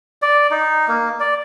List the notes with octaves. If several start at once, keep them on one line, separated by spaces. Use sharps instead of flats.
D5
D#4
A#3
D5